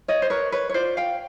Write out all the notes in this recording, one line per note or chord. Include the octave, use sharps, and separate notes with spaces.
C#5 D#5
C5
A#4 B4 C#5
B4 C#5
C#5
F4 C5 D5
F5 G5